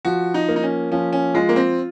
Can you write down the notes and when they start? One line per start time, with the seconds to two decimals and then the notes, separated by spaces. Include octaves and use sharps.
0.05 F3 F#4
0.34 D#4
0.48 A#3
0.56 D#4
0.63 C#4
0.92 F3 C#4
1.13 C#4
1.34 G#3 F4
1.49 A#3
1.56 C4